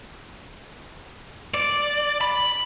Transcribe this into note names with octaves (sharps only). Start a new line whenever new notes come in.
D5
B5